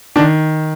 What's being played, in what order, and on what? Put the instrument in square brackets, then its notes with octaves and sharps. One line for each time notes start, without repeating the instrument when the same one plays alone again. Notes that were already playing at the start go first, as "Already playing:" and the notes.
[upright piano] D#3 D4